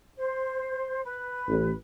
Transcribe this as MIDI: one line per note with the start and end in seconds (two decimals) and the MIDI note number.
0.16 1.01 72
1.04 1.73 71
1.48 1.71 33